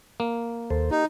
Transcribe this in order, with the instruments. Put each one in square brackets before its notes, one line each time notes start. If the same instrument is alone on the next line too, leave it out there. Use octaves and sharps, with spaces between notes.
[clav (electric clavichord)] A#3
[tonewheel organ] D#2 A4 C5
[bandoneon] D#4 [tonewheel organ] G4